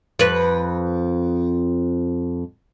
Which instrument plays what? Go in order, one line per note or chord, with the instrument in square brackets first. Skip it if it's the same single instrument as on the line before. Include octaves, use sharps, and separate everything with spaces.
[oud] F2 B4